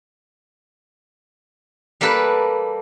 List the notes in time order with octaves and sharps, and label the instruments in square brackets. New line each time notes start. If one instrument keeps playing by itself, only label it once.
[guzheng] G3 A#3 G4 A4 B4